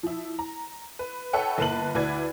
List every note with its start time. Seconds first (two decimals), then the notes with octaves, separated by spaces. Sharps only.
0.03 F3 E4
0.39 A#5
0.99 B4
1.33 A4 B4 C#5 E5 F#5 G5
1.58 G1 A#3 B4 A5 F#6 F#7
1.95 D2 E4 B4 D5 G#6